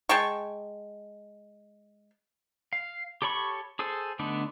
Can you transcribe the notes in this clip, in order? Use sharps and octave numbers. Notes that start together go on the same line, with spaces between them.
G#3 G5 A5 C#6
F5
G4 A4 C#5 B5 C#6
G#4 A4 C5 G#5
D3 A3 B3 D4 D#4